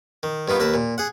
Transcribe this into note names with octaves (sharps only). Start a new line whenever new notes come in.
D#3
G2 D#3 B3 F4
D#2 A#4 B4 A5
A#2
G#4 F#5